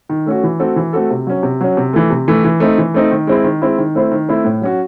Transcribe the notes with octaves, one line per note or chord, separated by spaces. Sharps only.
D#3
A3 C#4 F#4
E3
A3 C4 F#4 A4
E3
A3 C4 F#4 A4
C3
F#3 C#4
C3
F#3 C#4
C3
E3 A3
C3
E3 A3
E3
A3 C4 D#4
E3
A3 C4 D#4
D#3
G#3 C4 E4
D#3
G#3 C4 E4
D#3
A3 C4 E4 C5
D#3
A3 C4 E4 C5
A2
F#3 C#4 F#4